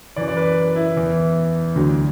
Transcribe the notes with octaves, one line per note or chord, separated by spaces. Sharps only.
F#2 E3 D5
D5
B4
E4
E2 E3
D2 D3 F#3